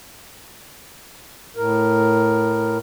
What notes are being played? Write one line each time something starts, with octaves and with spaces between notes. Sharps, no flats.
A2 A#4